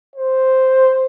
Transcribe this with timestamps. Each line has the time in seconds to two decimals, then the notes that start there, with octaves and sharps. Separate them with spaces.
0.16 C5